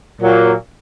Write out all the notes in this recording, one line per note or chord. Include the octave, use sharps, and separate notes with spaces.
A#2 F#3 A#3